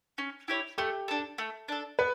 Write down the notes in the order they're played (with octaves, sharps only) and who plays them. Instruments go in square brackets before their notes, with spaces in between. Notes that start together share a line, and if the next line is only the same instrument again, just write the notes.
[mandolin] C#4
E4 G4 C#5
[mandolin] A3 [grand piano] G4
[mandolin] D4 A4
A3
D4 A4
[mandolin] B3 [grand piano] B4